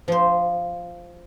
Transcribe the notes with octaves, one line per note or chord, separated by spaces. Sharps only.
F3 C5